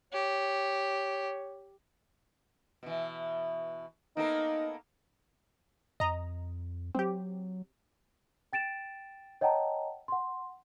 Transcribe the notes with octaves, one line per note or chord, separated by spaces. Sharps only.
G4 C#5
B2 E3
A#3 B3 D#4 A4
F2 D#5 A#5
F#3 C4 G4
G5 A6 D7 E7
C#5 D#5 F#5 G5 A5 A#5
F#5 C6